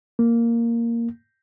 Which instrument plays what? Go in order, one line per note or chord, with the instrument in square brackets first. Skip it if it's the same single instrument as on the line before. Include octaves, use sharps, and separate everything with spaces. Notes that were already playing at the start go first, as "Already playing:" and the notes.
[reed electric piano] A#3